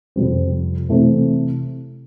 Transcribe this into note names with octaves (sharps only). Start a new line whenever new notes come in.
F2 C3 G3 C4
C3 E3 A3 C4